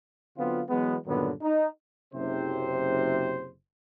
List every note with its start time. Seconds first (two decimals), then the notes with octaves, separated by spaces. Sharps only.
0.38 D3 F#3 B3 C4 F4
0.69 E3 F#3 G#3 B3
1.07 G2 A#2 D3 D#3 F#3 B3
1.42 D#4
2.14 F#1 C3 C5